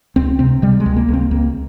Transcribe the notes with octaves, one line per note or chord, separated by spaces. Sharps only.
C#2 C4
C3 C4
C3 G3
G#3
C#2
A#3
C#2 C4
C#2 A#3